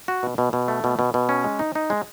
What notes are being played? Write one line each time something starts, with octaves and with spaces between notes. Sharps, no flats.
F#4
B2
B2
B2
A3
B2
B2
B2
C#4
G#3
D#4
D#4
G#3